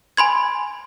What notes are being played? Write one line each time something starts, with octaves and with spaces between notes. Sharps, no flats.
G#5 B5 C6 G#6